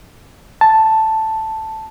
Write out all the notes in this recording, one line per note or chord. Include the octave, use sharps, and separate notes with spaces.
A5